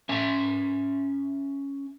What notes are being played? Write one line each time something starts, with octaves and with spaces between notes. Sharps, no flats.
C#4 E5 G#5